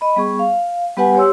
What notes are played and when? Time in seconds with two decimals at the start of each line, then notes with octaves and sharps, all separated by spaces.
0.01 D#5 B5
0.16 G3 B3 G#4 C#6
0.39 F5
0.97 G3 B3 G4 B4 F#5 G#5
1.15 G4 C#5 C6 E6